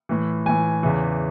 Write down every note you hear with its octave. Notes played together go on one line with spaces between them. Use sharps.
A2 E3
A2 E3 G#5
E2 C#3 E3